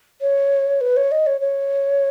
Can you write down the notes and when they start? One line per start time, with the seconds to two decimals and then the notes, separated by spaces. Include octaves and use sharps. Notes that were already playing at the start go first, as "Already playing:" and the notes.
0.21 C#5
0.81 B4
0.97 C#5
1.12 D#5
1.27 C#5
1.41 C#5